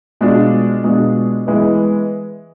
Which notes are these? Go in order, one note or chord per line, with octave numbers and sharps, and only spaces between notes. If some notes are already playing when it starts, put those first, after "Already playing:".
B2 G#3 D4 F4
B2 G#3 D4 F4
E3 G#3 B3